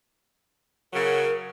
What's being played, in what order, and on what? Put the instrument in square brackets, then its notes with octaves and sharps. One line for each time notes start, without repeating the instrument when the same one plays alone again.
[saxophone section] C#3 F#3 [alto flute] A#4